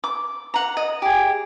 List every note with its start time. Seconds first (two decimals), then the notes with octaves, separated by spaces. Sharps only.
0.04 D6
0.54 F#5 A#5
0.77 D#5
1.02 G4 G#4